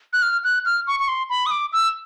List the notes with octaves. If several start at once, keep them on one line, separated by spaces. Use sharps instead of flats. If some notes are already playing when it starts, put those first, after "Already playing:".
F#6
F6
F#6
F6
C#6
C#6
C6
B5
D#6
D6
E6